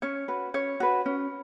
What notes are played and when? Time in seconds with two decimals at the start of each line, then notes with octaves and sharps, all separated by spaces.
0.02 C#4 C#5
0.28 F#4 B4
0.54 C#4 C#5
0.80 F#4 B4
1.06 C#4